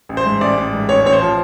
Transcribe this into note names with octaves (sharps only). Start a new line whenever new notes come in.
A1
C5
G#2
A1 D5
A1
G#2
A1 C#5
A1 C#5
C5
F3